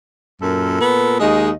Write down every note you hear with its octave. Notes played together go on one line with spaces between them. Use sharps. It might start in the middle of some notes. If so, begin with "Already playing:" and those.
F#2 A#2 A4 A#4
B3
D#2 G#3 D#5